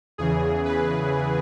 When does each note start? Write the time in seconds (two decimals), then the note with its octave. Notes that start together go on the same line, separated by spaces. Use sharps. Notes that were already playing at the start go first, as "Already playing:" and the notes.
0.18 E2 C#3 E3 G#4
0.65 B4